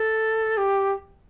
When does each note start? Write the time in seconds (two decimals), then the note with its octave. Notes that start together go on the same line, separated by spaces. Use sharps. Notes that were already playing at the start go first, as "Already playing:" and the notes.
Already playing: A4
0.57 G4